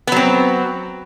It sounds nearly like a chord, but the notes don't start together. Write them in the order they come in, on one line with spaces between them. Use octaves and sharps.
B3 F#3 C4